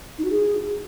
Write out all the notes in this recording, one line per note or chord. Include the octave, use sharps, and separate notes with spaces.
D#4
F#4
G#4